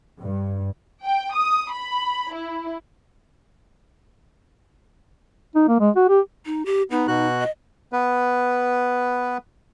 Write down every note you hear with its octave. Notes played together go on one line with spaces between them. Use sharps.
G2
G5
D#6
B5
E4
D#4
A#3
G#3
F#4
G4
D#4
G4
B3 D#4
B2 F#4 F#6
D#5
B3 B4